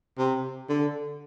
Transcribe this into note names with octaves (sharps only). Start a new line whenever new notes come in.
C3
D3